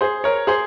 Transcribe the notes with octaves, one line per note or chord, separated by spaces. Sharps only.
G#4 C5
A#4 C#5
G#4 C5